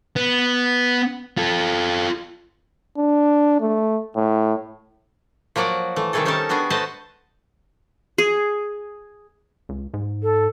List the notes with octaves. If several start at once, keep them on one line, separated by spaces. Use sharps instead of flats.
B3
F4 A4
D4
A3
A2
F3 F#3 A#3 D5 F#5
E3 A3
C3 D#3 G3 A3 G#4 A4
G3 C#4 D#4 A4 A#4 A5
G3 B3 D4 F#4 G#4
A3 B4 C5 D#5 F#5 A5
G#4
C#2
G#2
A4